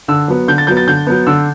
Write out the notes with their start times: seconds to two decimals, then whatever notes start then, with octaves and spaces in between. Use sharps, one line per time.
0.08 D3 E6
0.28 F#3 B3
0.48 D3 G6
0.58 A6
0.67 F#3 B3 G6
0.77 A6
0.87 D3 G6
1.07 F#3 B3
1.27 D3 E6